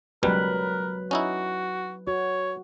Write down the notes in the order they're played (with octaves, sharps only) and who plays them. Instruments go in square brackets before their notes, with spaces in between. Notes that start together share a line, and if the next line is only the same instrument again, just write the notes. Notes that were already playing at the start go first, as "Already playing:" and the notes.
[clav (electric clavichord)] C#2 B2 G3 [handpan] F#3 B4 [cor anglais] A#4
[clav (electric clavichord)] C#4 D#4 E4 [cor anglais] F#4
[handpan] F#4 [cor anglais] C#5